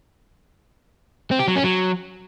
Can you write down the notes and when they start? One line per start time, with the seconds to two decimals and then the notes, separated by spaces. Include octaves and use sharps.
1.31 C4
1.39 G4
1.48 F#3
1.56 C#4
1.64 F#3